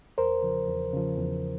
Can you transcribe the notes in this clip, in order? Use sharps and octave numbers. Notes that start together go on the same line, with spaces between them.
E2 A#4 C5
C#3 F3
E2
C#3 F3
E2